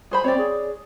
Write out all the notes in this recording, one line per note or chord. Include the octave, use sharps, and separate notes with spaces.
G#4 C5 B5
C4 C#5 D5
G#4